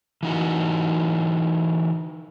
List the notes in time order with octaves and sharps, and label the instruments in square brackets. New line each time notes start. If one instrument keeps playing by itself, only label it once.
[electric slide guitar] E3 D#4 F#4